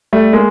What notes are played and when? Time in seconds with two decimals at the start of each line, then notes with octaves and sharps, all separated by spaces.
0.13 G3 A3
0.33 G#3 A#3